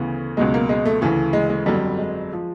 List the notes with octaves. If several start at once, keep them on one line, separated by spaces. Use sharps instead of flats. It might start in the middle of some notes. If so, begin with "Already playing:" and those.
Already playing: D2 C#3 E3 B3
C#2 B2 F#3 G#3
A#3
G#3
A3
D2 C#3 E3 A3
G#3
G#3
G1 F2 D3 F#3 G3
G#3
F3